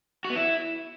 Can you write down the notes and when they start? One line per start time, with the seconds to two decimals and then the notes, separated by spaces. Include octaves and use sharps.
0.25 F#4
0.30 B3
0.35 E4